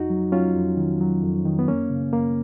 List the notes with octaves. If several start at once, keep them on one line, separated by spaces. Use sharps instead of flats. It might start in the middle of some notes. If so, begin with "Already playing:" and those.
Already playing: F2 D#4 F#4
F#3
F#3 C#4 F4
F2
D#3
F#3
F2
D#3
B3
F#2 A#3 C#4
C#3
F#2 A#3